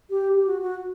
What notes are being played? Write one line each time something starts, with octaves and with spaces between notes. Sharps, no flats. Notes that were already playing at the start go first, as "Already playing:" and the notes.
G4
G4
F#4
F#4